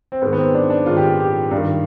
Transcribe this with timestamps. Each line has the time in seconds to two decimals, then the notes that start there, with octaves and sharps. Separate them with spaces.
0.12 C4
0.22 G#2 D#3 B3
0.33 B3
0.38 C4
0.54 D4
0.70 D4
0.86 G#2 D#3 F4
0.97 G4
1.05 F4
1.20 G4
1.51 G2
1.56 D#3